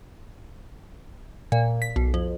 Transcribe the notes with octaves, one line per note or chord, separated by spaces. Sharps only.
A#2
B6
B1
F2